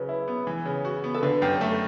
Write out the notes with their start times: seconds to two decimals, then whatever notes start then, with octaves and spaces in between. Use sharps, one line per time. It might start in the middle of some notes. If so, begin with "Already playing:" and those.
Already playing: C#3 F#3 B4
0.09 E4
0.28 B3
0.47 E3
0.65 C#3
0.85 F#4
1.04 B3
1.14 A4
1.23 D3 B4
1.42 F#2 G4
1.61 A3 A4